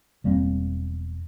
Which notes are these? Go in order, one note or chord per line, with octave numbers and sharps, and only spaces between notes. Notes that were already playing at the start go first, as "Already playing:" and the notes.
E1 G3 A#3 C4